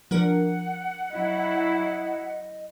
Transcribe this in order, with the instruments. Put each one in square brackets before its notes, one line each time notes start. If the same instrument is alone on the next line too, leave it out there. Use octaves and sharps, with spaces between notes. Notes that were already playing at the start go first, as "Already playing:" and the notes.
[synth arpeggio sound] F3 D4 A#4 [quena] F#5
[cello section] F#3 E4 [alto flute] D#5